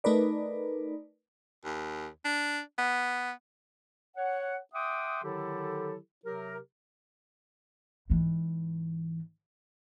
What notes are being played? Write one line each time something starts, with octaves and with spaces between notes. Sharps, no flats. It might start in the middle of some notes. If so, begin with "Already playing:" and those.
A3 D#4 A#4 B4 D5
D#2
D4
B3
C#5 F#5
E5 F#5 G5 C6 D6 D#6
D3 D#3 F#3 E4 G4 A4
C3 F#3 G4 A#4
G#2 E3